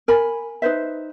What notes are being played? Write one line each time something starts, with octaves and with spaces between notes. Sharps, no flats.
A#4 G#5 B5
D#4 B4 C5 E5